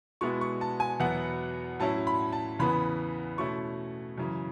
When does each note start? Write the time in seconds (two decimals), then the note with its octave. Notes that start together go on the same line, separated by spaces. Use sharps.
0.21 B2 G#3 B3 E4 C#6
0.41 C#6
0.61 A5
0.80 G#5
1.00 E2 B2 F#3 B3 E4 F#5
1.79 A2 F#3 C#4 E4 A5
2.07 B5
2.32 A5
2.59 E2 C#3 E3 B3 B5
3.38 B2 A3 C#4 E4 C#6
4.18 F#2 C#3 E3